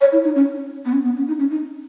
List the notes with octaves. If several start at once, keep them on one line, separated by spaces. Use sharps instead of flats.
C#5
E4
D#4
C#4
B3
C#4
B3
C#4
D#4
C#4
D#4